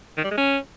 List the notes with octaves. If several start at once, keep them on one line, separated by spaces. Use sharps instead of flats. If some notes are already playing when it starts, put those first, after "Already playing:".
D#3
G3
G#3
C#4